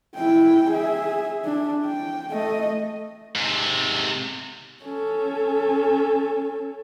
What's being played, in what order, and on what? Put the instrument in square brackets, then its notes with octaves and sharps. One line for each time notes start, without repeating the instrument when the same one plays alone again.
[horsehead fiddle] E4 G5
G#4 E5
D4
G5
A3 D#5
[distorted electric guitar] G#2 C3
[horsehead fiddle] C#4 A4